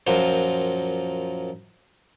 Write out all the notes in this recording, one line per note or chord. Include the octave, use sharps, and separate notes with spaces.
F#2 A#2 F3